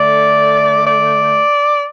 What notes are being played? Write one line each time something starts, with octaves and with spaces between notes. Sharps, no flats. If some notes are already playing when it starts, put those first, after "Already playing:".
Already playing: D3 A3 D5
D5